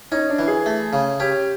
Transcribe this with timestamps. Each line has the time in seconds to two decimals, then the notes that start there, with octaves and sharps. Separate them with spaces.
0.12 C#4 D#4
0.30 D4
0.39 E3
0.47 G#4
0.66 A3
0.93 C#3
1.20 C#4 G4